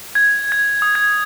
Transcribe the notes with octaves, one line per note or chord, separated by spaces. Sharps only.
G#6
G#6
D#6
G#6